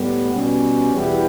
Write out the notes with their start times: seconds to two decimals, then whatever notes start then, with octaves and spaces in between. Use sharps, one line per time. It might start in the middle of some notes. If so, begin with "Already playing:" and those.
Already playing: A2 G3 B3
0.34 B2 G3 C#4
0.92 E2 B2 G3 B3 E4